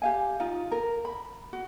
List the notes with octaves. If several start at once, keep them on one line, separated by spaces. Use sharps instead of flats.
G4 F5 G#5
D#4 F4
A#4
B5
F#4